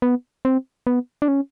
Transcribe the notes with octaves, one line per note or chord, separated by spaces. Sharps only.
B3
C4
B3
D4
C#4